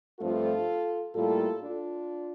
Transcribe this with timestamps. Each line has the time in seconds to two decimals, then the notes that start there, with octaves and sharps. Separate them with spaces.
0.20 G2 F3 A3 C4 F4 A4
1.16 A2 G3 A#3 F4 A4
1.63 D4 F4